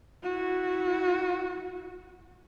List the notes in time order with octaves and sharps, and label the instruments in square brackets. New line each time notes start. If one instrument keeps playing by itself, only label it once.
[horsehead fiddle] E4 F#4